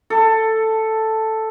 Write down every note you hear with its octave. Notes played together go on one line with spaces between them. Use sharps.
A4